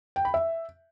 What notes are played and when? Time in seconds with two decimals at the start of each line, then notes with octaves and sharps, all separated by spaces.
0.16 G5
0.25 B5
0.34 E5